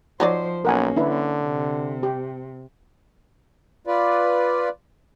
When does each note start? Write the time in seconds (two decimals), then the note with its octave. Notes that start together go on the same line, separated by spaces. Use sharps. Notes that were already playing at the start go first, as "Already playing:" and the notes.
0.20 F3 F#3 D#4 C5 D5
0.65 B1 A#3 C#4 A#4 F#5 G#5
0.96 D3 D4 E4 B4
1.44 C3
2.03 G4
3.87 F4 B4 D5